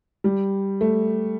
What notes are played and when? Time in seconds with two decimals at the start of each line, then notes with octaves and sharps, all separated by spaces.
0.24 G3
0.81 A3